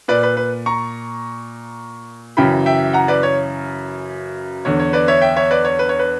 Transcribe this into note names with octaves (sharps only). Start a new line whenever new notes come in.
A#2 B4 D5
B4
B4
A#5 C#6
F#2 C#3 E3 G5 B5
E5 G5
F#5 A#5
B4 D5
C#5
E2 D3 C#5
C#5
B4 D5
C#5 E5
E5 G5
C#5 E5
B4 D5
C#5
B4
C#5
B4